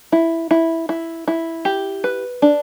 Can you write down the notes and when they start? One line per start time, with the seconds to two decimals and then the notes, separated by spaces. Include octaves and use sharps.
0.12 E4
0.51 E4
0.89 E4
1.28 E4
1.65 G4
2.04 B4
2.42 D4